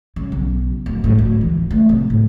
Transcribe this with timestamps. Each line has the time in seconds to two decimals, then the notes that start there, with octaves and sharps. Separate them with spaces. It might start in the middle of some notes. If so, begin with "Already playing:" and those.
0.16 C#3
0.32 B1
0.86 D1
1.04 A2
1.19 D2
1.41 E3
1.71 A3
1.89 C3
2.10 A2